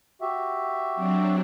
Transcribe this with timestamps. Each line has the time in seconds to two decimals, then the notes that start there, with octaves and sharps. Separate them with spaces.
0.21 F#4 G4 E5
0.96 F#3 C4 D4